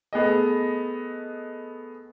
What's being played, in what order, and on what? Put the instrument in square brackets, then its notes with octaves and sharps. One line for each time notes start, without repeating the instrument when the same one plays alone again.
[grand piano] A3 B3 G#4 D#5